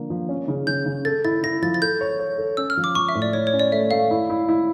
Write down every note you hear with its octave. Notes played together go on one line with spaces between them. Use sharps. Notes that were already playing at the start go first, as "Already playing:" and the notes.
Already playing: D3 F3 A#3
F3
C#4
C#3
C#3 G6
C#3
A4 A6
E4 A6
E4 A#6
F3 A6
A6
A4 G6
C#5
C#5
A4
C#4 E6
F6
F3
D6
F3 C#6
E5
A2
D5
E4 C#5
C#5
C#4
D5
A3 E5
A3 F5
E4
E4
E4